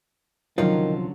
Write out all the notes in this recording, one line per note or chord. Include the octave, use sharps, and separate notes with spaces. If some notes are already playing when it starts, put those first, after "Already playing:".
C2 D3 D#3 F3 F#3 C#4 F4